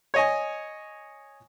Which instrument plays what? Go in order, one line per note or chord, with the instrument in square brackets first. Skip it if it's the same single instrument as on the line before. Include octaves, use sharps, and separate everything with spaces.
[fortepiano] C#5 D#5 G#5